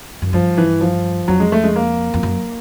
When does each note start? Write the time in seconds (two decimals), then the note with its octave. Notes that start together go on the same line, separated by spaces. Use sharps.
0.22 F#2
0.33 G2 F3
0.57 E3
0.81 F3
1.28 F2 F#3
1.40 G#3
1.52 A3
1.64 G#3
1.76 A#3
2.14 F2
2.23 F#2